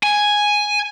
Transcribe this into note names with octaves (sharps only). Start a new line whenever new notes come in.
G#5